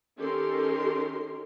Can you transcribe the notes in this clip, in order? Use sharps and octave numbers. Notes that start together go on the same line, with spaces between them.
D#3 C#4 G4 A4 A#4 C6